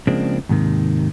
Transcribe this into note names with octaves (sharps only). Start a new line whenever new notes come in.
C#3 F3 G#3 A#3 C4 D4
D#2 G#2 C3 D#3